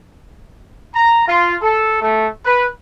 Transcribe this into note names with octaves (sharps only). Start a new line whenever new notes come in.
A#5
F4
A4
A3
B4